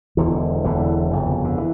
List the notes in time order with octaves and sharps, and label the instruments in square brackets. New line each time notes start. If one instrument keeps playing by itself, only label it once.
[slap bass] E1 E2 D3 E3
E1 E2 D3 E3
G1 F2 C#3
D3
E3